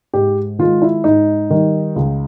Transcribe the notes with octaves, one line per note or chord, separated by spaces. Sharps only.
G#2 G4
D#3 G#3 F4
E4
G#2 D#4
D#3 G3
C#2